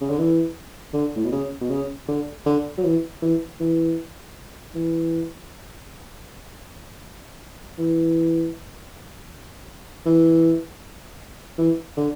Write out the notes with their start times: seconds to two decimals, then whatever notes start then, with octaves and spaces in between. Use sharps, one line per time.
0.01 C#3
0.09 D3
0.19 E3
0.93 D3
1.16 A2
1.24 B2
1.32 C#3
1.61 B2
1.70 C#3
2.08 D3
2.46 D3
2.78 F#3
2.84 E3
3.22 E3
3.60 E3
4.75 E3
7.78 E3
10.06 E3
11.58 E3
11.97 D3